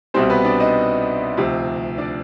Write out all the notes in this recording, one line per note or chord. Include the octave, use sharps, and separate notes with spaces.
C2 B2 G3 C4 C5
B3 B4
D4 D5
D#4 D#5
D2 C3 F3
D4 D5